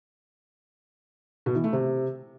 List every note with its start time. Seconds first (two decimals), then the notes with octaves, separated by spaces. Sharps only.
1.46 B2
1.55 E3
1.64 A3
1.73 C3